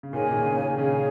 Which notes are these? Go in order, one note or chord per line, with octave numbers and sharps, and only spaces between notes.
C#3
A#2 D#3 G#4 C#5 G#5
A#2
C#3
A#2 D#3
C#3 G#4 C#5 G#5